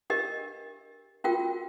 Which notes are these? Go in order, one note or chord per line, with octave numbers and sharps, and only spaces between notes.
D4 G4 A#4 D#5
C#4 F4 F#4 A#4 G5